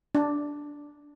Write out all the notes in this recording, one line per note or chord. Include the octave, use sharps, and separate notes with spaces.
D4